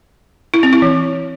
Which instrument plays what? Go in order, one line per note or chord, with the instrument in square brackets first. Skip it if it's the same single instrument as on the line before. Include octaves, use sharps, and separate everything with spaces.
[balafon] E4
C4
E4
E3